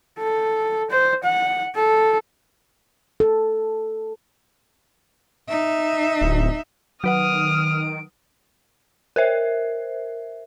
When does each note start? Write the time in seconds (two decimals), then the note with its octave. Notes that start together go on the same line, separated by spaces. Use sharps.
0.18 A4
0.91 C5
1.24 F#5
1.75 A4
3.20 A4
5.49 D#4 E5
6.21 D1
7.04 D#3 F#3 B4 F#5 D#6 F6 D7
9.16 A#4 C5 E5